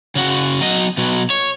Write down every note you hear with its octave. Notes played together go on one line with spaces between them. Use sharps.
C#3 F#4
F#3 D#5
B2 F#3
C#5